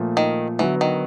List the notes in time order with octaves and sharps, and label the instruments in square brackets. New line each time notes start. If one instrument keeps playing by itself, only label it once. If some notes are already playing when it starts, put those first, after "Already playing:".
Already playing: [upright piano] A#2 F3 A3
[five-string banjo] D#3
[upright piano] D3 F#3 B3 [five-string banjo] E3
[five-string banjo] D#3